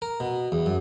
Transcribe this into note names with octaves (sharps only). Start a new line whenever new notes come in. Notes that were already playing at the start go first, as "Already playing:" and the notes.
A#4
B2
E2
F#2